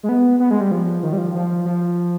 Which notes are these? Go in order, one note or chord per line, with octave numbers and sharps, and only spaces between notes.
G#3
B3
B3
G#3
G3
F3
D#3
G3
F3
F3
F3